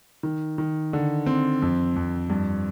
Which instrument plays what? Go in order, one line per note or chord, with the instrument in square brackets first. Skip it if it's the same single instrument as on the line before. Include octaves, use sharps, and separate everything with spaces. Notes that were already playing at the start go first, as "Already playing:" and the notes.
[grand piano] D#3
D#3
D3
C4
F2
F2
G2